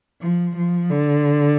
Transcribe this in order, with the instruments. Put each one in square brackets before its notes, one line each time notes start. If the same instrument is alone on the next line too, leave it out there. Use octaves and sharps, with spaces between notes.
[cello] F3
F3
D3